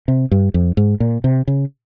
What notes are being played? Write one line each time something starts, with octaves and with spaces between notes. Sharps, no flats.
C3
G2
F2
G#2
A#2
C3
C#3